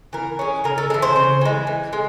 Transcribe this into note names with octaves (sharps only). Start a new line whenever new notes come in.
E3 A#4
G#3 C#4
C#3 A#4
A4
E3 G#3 A4
C5
C#3
E3 G#3
E3
G#3